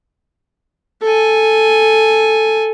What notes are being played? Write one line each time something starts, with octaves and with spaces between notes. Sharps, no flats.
A4 G#5